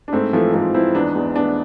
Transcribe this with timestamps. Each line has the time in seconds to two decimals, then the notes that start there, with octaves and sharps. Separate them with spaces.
0.08 D4
0.13 G#2 A3 C4
0.33 E3 F3 A3
0.54 G#2 F3 A3
0.74 E3 C4 E4
0.95 E2 B3 D4
1.15 E2
1.35 E3 B3 D4